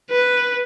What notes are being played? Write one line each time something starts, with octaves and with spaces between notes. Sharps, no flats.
B4